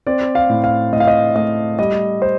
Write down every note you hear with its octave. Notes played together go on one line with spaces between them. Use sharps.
C4 D5
F5
A2
F5
A2 D#5
F5
D#5
A3 D#5
G3 D#5
C5